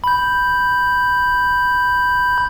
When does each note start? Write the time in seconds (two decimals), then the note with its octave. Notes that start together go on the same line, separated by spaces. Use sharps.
0.04 B5 G6